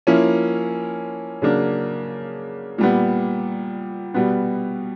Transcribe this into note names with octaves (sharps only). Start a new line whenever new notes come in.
F3 A#3 C#4 E4
C#3 F#3 A#3 D4
A#2 G3 B3
B2 G3 B3